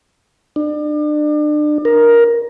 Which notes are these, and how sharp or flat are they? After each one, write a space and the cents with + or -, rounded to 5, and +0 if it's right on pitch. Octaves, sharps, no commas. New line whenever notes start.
D4 +35
A#4 +10